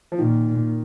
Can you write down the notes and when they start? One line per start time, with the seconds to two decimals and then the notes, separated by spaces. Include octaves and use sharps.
0.12 F3
0.19 A#2 D#3